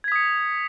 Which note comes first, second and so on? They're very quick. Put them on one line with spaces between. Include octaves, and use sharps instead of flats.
G#6 B6 D#6 C#7